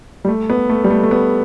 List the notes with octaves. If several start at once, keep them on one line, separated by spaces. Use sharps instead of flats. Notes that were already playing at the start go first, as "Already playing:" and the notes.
G3
A3
B3
A3
G3
A3
A3
B3